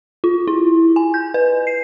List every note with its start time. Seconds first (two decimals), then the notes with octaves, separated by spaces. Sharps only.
0.24 F4
0.47 E4
0.96 G#5
1.14 G6
1.34 B4
1.67 C7